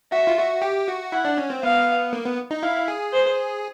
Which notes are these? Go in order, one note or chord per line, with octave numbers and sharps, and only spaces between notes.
F#4 E5
F4
F#4
G4
F#4
E4 F#5
D4
C#4
C4
B3 F5
A#3
B3
D#4
E4 F5
G#4
C5